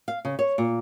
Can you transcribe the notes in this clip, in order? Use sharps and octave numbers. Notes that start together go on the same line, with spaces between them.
F5
C#3
C#5
A#2